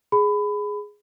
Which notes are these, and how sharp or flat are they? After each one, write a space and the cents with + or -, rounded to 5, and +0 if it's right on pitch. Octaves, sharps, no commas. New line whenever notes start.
G#4 +0 B5 +20